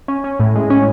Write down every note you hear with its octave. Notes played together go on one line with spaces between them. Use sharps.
C#4
C#4
A2
G#3
C#4